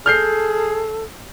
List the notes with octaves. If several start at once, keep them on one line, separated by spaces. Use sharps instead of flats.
G#4 A4 F6 G6 C7